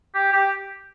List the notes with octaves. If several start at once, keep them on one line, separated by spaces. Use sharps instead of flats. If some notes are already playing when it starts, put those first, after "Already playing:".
G4
G4